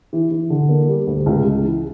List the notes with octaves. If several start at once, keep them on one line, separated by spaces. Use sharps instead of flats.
E3
E3
D3
A#3
G3
D2
C#2
C#2
E3